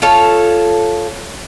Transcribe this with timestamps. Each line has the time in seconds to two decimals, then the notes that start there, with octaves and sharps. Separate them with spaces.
0.02 F4 A4 C#5